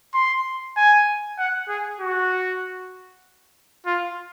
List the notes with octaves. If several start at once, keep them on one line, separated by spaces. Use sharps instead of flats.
C6
G#5
F#5
G#4
F#4
F4